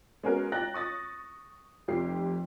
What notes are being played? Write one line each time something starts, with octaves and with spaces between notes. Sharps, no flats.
G#3 B3 C#4 F#4 G#4 A#4
G5 A#5 F#6 A6 A#6
C#6 D#6 A6 A#6
F1 F2 G4 C7